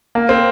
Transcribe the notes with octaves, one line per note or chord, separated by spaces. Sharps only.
A#3
C4